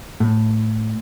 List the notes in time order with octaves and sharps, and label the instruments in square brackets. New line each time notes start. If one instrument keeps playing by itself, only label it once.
[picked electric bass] A2